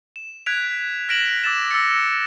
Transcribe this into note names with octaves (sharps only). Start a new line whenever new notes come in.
E7
F#6 G#6 B6 D7 F7
F6 A#6 B6 D7 E7 F#7
D6 E6 A6 E7
E6 A6 A#6 C#7